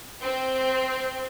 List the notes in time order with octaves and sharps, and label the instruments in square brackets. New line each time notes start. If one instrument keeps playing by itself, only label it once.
[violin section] C4